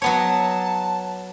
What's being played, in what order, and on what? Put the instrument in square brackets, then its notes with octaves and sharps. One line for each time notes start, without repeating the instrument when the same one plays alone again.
[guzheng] F#3 B3 C#5 [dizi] A5